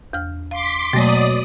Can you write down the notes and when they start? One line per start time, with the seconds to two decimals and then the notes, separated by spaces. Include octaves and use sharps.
0.13 E2 F6
0.51 F5 C6 D6 B6
0.93 B2 F#3 A3 A#3 D5 D#6